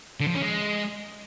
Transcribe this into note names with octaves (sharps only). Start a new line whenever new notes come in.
D3
F3
C#4
G#3